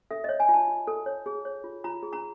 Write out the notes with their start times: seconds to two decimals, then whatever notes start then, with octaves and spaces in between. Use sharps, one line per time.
0.11 A4 E5
0.24 C#5 D#5
0.40 G#5
0.49 F4
0.54 A5
0.68 F4
0.88 A4
1.06 C#5
1.26 G#4
1.45 C#5
1.64 F4
1.84 F4 A#5
2.03 G#4
2.13 A#5